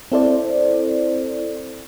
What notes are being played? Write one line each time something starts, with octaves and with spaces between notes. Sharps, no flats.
C4 E4 A4 C5 D5